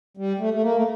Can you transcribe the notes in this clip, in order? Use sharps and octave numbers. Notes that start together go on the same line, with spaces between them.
G3
A3
A3
A#3
A3